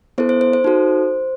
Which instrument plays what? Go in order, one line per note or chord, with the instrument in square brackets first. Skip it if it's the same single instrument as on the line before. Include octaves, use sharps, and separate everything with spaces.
[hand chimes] B3 E4 A4 C5
C5
C5
C5
D#4 F#4 A4